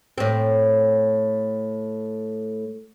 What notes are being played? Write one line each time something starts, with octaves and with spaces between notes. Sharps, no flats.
A2 C4